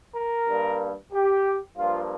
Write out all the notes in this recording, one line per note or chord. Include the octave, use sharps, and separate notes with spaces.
A#4
G2 G3 A#3
G4
G2 F3 A#3 F4